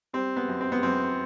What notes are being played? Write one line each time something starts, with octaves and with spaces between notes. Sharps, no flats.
G3 C4
B3
F#2
C4
B3
F#2 C4